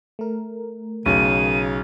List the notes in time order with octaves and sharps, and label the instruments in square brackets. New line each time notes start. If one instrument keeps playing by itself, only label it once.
[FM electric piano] A3 A#4
[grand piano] B1 [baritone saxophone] C#3 [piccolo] D#7